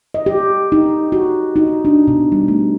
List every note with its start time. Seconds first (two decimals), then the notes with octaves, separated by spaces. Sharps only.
0.14 D#5
0.26 G4
0.72 D#4
1.12 F#4
1.56 D#4
1.85 D4
2.08 B2
2.32 G3
2.48 A3